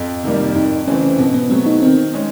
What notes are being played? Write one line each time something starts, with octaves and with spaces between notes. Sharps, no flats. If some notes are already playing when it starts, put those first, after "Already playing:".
Already playing: F2
C3 D#3 G3 A#3
F2 D#4
C#3 E3 A3 C4 C#4
B2 C4
B3
F#3 A3 C4
D#4
D#3 C4
G#3 C#4